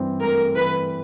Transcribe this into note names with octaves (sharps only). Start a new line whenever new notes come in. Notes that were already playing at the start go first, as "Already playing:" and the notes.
Already playing: G2 E3 C4
A3 A#4
E3 B4